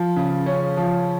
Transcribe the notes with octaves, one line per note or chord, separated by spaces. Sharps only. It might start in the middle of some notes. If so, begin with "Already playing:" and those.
Already playing: F3
C#3
C#4
F3